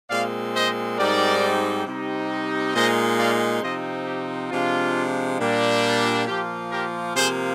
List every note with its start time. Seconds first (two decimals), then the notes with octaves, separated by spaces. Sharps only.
0.10 A#2 G#3 C4 D5 F5
0.55 C5 D#5
0.98 G#2 G3 C4 D#4 A#4 D5
1.86 C3 G3 C4 D#4
2.74 A#2 G#3 D#4 C5 D#5
3.19 D5 F5
3.62 C3 F3 C4 D#4 C5 D#5
4.06 G4
4.51 C3 F3 G#3 D4 F4
5.40 A#2 G3 D4
6.27 A#2 F3 A#3 F4 G4
6.71 G4 A#4
7.15 C3 F3 A#3 G#4 C5